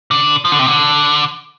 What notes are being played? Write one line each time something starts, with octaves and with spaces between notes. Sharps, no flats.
D3
F3
D3
C3
D3